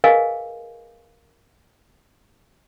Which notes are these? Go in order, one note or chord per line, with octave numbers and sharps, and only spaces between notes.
G#4 A#4 B4 D#5 F5 G#5